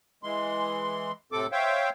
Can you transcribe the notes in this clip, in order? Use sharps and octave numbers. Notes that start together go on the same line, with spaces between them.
E3 G#3 C6
A2 C3 C4 A4 D6
C5 C#5 E5 F5 G5